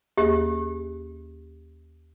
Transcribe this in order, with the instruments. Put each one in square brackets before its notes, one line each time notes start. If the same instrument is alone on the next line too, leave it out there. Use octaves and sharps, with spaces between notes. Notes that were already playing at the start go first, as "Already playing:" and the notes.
[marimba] D#2 A#3 G#4 [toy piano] G4